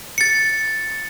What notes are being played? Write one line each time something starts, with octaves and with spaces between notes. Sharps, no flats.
A6 C#7